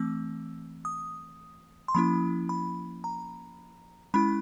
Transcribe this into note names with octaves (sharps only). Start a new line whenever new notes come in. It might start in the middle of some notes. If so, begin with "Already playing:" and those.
Already playing: E3 A3 C4 E6
D#6
C6
F3 A#3 C#4 E4 B5
B5
A#5
G#3 C#4 E4 B5